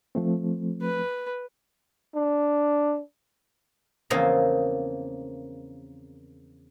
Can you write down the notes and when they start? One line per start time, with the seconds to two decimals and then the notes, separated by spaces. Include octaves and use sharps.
0.15 F3 A3 C4
0.82 B4
2.15 D4
4.10 E2 C#3 F3 A#3 C4 D#5